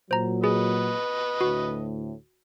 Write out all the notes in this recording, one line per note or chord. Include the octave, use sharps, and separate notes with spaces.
A#2 F#3 C5 A#5
G#4 B4 D#5
D2 A2 F#4